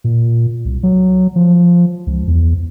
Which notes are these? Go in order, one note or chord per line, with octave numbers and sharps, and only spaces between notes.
A#2
C2
F#3
F3
C#2
E2